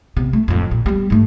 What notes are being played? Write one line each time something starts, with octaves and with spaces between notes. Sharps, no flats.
C3 B3
A3
D1 F2
A#2
G3 B3
G#2 A3